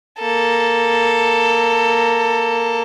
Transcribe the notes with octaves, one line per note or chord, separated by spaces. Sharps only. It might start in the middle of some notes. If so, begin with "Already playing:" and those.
A#3 A4